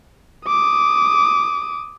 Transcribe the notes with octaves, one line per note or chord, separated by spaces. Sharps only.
D6 D#6